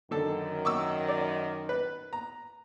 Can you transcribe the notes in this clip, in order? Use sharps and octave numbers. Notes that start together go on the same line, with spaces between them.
F#2 D3 D#3 A4
C#6 D6 E6
D5
B4
A#5